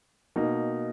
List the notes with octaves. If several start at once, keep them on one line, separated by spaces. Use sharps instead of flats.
B2 A#3 D#4